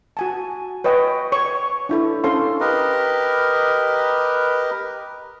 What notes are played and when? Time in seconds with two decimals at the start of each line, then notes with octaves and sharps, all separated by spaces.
0.17 F#4 G#5 A5
0.84 B4 C#5 D#5 G5 C#6
1.32 C#5 C#6
1.89 D4 E4 A4
2.24 C#4 A4 C5 C#5 F5 C6
2.60 G4 A#4 B4 D#5